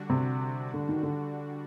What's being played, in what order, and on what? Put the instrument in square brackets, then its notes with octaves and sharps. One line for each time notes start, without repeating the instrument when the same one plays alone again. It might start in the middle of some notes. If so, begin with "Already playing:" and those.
Already playing: [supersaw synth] D3 G3 D4 F#4
[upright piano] C3
D3
D#3
D3